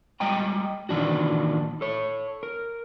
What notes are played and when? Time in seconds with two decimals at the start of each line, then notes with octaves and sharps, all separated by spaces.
0.20 G3 G#3 D#5 G5 A#5
0.89 A#2 D#3 E3 D4 F#4
1.81 A4 C#5
2.43 A#4